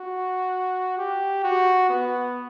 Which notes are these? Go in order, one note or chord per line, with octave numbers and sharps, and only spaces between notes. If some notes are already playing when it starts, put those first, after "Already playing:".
Already playing: F#4
G4
F#4
B3